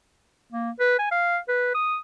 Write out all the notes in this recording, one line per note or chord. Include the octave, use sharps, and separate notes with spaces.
A#3
B4
G#5
F5
B4
D#6